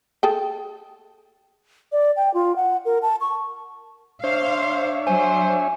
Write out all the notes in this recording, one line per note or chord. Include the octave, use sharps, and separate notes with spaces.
G#4 A4 G5
D5
G5
F4
F#5
A#4
A5
C#6
D4 C5 C#5 E5 F5
F#3 C5 G#5